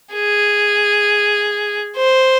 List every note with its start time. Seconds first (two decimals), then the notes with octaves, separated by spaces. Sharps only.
0.13 G#4
1.96 C5